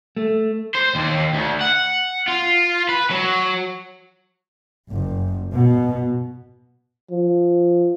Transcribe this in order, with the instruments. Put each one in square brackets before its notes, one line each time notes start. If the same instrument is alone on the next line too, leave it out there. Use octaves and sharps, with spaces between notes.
[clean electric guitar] A3
[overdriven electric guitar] C5
D#2
D2
F#5
F4
B4
F#3
[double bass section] F#1
B2
[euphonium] F3